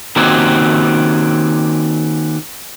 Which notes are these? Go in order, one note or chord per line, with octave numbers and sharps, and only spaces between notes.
D#3 A#3 C4 C#4 F#4 G4